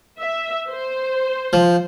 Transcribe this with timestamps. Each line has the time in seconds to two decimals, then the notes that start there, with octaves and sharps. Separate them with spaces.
0.20 E5
0.70 C5
1.53 F3